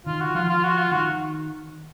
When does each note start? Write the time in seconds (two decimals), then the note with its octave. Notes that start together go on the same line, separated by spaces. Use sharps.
0.06 D#3 F4
0.21 F#4
0.35 F3 F4
0.49 F4
0.64 F#4
0.78 F4
0.92 D#3 F#4